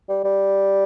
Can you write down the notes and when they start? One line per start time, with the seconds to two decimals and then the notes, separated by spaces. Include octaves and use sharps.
0.09 G3
0.24 G3